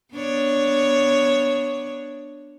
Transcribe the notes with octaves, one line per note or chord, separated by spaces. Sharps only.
B3 D4 C#5